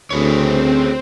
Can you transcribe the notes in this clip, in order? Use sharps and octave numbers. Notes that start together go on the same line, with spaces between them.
D2 C4 G#4 B4 C#5